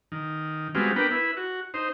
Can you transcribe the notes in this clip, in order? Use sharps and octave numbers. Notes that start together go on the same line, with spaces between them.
D#3
G3 G#3 B3 C4 F4 F#4
B3 D4 A#4 B4 G5
E4 B4
F#4
D#4 C5